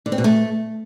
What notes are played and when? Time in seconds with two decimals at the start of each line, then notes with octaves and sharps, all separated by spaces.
0.06 D3
0.12 C4
0.18 B2
0.24 A3